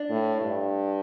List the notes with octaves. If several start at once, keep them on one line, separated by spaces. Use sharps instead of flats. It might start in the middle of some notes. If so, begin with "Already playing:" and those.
Already playing: D4
A2
G2